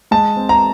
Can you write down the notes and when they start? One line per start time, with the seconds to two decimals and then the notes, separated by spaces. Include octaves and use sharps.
0.11 G#3 A5
0.36 C4
0.49 A#5